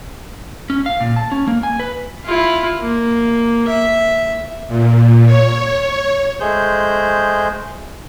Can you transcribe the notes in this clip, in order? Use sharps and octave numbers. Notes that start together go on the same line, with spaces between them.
C#4
F5
A#2
A5
C#4
A#3
G#5
B4
E4 F4
A#3
E5
A#2
C#5
G#3 A3 G#4 C5 G6